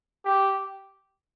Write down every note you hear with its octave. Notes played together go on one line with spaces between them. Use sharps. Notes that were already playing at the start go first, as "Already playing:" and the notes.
G4